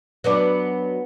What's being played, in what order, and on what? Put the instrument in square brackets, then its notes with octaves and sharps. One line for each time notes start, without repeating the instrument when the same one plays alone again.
[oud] F#3 B3 D4